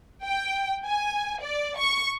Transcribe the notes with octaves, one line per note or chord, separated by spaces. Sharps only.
G5
G#5
D5
C#6